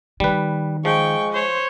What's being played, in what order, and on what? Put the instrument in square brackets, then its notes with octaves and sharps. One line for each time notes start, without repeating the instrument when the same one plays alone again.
[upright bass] D#3 [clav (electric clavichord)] G3 B4
[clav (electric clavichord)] F3 [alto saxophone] G#3 [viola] G5 C#6
[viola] C5 C#5